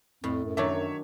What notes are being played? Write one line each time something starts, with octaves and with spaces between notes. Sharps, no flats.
F2 A2
F#2
D#3 F#3 D4 C#5 E5